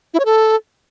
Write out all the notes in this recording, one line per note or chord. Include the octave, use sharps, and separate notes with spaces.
E4
C#5
A4